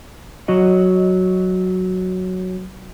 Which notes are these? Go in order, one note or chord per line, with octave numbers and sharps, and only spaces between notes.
F#3 F#4 D#5